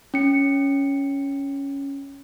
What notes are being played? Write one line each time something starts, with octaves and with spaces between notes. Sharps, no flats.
C#4 C#7